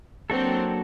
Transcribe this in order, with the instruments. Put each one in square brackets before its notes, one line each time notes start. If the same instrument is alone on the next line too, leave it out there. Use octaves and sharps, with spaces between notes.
[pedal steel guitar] F#3 A#3 D4 F#4 A4 [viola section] C4